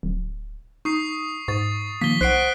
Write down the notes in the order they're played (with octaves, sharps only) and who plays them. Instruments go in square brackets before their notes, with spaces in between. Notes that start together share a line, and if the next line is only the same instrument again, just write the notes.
[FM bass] D1
[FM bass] D#4 [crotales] C#6 D#6 C7
[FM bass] G#2 [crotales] C#6 A6
[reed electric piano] A2 D#3 F3 [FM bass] A#3 [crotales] B6 G7
[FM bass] B1 [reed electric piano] C5 F#5 [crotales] F#6 C7 D7